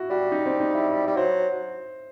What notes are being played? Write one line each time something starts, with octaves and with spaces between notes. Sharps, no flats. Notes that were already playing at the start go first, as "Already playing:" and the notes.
Already playing: E4 F#4
G3 F#4
D#4
C4
D#4
E4
G3
F#3 C5